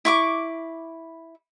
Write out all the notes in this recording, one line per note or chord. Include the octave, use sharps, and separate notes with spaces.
E4 C#6 D6